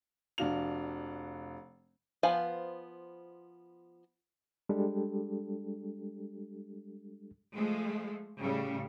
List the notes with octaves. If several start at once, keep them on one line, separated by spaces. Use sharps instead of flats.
F1 D4 F#4 F5 F7
F3 B3 C5 F5 G#5
G3 G#3 D4 G4 A4
F3 G#3 A3
A2 C#3 G3